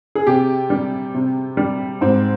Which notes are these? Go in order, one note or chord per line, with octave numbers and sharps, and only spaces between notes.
G#4
C3 G4
G3
C3
G3
G#2 C4